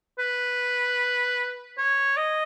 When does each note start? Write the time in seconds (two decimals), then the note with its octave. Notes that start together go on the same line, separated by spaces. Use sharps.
0.19 B4
1.78 C#5
2.17 D#5